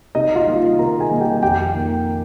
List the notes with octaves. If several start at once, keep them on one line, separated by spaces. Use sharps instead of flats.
C3 D#4 D#5
D#5
F4 F5
D#3 G3 A#3
C3 A#4 A#5
G#4 G#5
D#3 G3 A#3
G4 G5
G#5
F2 G4 G5
D#3 A#3